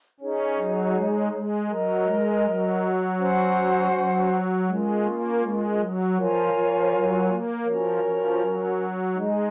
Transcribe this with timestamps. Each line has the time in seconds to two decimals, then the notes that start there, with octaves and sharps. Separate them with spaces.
0.20 C#4 D#4 G#4 C#5
0.57 F#3
0.94 G#3
1.32 G#3
1.69 F#3 A#4 D#5 A#5
2.06 G#3
2.44 F#3
3.18 C#4 F#4 C5 F#5
3.92 F#3
4.67 G#3 C#4 F4 A#4
5.05 A#3
5.42 G#3
5.79 F#3
6.16 F3 F4 A#4 C#5 G#5
6.54 F3
6.91 F#3
7.28 A#3
7.65 F3 C#4 F#4 A#4 C#5
8.03 F3
8.39 F#3
9.14 G#3 D#4 G#4 D#5